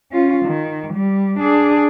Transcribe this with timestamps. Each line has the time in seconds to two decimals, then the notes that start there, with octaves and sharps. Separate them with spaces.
0.12 C#4 F4
0.45 D#3
0.94 G3
1.40 D4 G#4